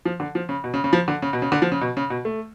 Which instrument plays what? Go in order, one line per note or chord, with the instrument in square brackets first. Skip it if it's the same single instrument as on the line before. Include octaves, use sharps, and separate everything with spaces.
[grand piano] F3
D3
F3
C#3
B2
C#3
C#3
F3
D3
C#3
B2
C#3
D3
F3
C#3
B2
C#3
B2
A3